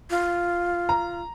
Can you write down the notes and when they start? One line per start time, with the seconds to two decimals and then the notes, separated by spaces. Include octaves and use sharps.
0.10 F4
0.89 A#5